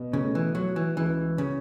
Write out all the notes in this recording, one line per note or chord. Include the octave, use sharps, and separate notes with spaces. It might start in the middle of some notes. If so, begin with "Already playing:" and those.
Already playing: B2
C#3 A3
E3
F#3 F#4
E3
C#2 E3
C#3